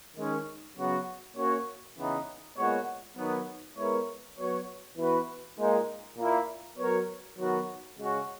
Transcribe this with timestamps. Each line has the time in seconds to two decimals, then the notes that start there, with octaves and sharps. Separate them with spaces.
0.16 D#3 G#3 C#4
0.76 C#3 F#3 B3 F#4
1.36 A#3 C#4 F#4 C#5
1.96 C#3 E3 B3 D#4
2.57 A#2 G#3 B3 F#4 C#5
3.17 D#3 F#3 B3
3.77 G#3 B3 E4 A#4 C#5
4.37 F#3 B3 F#4 C#5
4.97 E3 B3 F#4 B4
5.58 A#2 G#3 D#4
6.18 A#2 A#3 E4
6.78 F#3 B3 F#4 A#4 C#5
7.37 D#3 F#3 B3 F#4 A#4
7.98 C#3 G#3 C#4 F#4 C#5